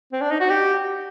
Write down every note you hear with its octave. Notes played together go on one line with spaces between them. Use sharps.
C4
D4
D#4
F#4
G4